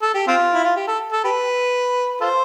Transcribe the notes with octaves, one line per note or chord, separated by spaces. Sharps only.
A4
G4
C4 F4
E4
F4
G4
A4
A4
G4 B4
F4 A4 C5